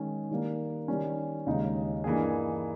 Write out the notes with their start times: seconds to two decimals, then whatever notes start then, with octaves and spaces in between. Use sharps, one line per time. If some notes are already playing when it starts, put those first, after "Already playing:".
Already playing: D#3 G#3 C#4
0.31 D#3 G3 A#3
0.88 D#3 G3 C#4
1.46 D#2 C#3 G#3 D#4
2.04 G2 E3 A#3 D#4 G#4